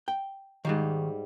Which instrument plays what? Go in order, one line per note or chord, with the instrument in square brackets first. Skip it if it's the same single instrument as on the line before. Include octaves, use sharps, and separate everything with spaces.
[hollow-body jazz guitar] G5
[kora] G#2 G3 F5 [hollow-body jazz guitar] D#3